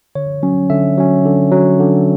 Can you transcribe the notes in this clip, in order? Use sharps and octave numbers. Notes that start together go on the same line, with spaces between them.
D3 C#5
F#3 C#4
D3 E5
F#3 C#4
D3
F#3 C#4
D3